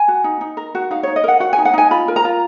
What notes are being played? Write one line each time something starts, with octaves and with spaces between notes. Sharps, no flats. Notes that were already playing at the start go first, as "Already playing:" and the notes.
Already playing: G#5
F#4
D#4
D#4
A#4
F#4
D#4 F5
C#5
D#4
D#5
A#4 F#5
F#4 F#5
G#5
D#4
F#5
D#4 G#5
F4 B5
A#4
A#5
F4